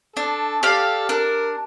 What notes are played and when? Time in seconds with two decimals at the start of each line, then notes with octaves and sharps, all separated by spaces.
0.16 D4 A4
0.63 G4 A4 D5 F5
1.09 D4 A#4